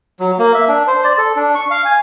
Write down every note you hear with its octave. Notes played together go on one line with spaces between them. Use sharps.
F#3
A#3
E5
D4
C5
D5
A4
D4
C#6
F5
G#5